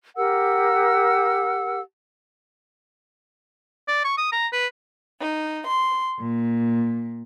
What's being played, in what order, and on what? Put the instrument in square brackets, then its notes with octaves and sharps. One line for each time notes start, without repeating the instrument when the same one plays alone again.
[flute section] G4 A#4 F#5 E6
[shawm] D5
C#6
D#6
A#5
B4
[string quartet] D#4
C6
A#2